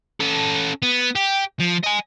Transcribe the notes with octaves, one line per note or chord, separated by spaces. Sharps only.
C#4 A4
B3
G4
F3
D#5 G#5